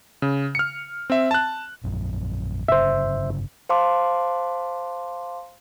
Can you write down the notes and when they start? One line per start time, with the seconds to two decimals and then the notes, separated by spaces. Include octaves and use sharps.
0.22 C#3
0.55 F6 C#7
1.10 C4 E5
1.31 A5 F#6
1.84 A#1 F#2 F3
2.68 G1 C#3 C5 E5
3.69 C5 F5 A5 C6 D6